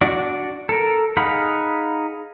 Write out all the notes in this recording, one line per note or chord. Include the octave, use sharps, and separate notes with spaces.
D4 F#4 D5
A4 A#4
D#4 G#4 F5 F#5 B5